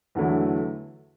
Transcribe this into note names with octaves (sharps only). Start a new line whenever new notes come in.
E2 D3 F#3 A3 E4